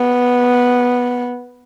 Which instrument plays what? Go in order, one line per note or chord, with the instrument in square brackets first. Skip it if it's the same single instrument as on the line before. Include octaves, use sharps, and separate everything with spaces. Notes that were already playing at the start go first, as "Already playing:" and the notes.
Already playing: [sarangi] B3